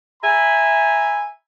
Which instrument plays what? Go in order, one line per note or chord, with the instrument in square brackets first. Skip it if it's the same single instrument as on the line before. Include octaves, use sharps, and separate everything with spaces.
[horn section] E5 G#5 A#5 B5